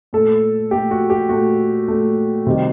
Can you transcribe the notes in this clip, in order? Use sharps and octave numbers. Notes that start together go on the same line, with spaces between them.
A#2 A3 A4
A#2 A3 G4
F#4
G4
A#2 A3 F#4
A#2 A3
C3 D#3 G3